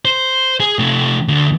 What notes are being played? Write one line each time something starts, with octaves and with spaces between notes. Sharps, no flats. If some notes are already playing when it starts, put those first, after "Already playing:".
C5
G#4
C3 A3
D2